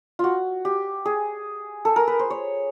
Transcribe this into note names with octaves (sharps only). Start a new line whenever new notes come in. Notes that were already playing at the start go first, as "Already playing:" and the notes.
F4 F#4
G4
G#4
A4
A#4
B4
C5
C#5